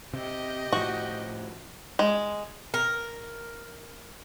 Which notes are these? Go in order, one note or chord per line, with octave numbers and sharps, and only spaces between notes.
C3 G4 D#5
A2 F3 F#4
G#3
A#4